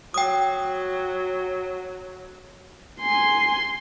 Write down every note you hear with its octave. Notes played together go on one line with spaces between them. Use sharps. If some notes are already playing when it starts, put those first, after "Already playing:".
F#3 G5 D#6
G#5 C6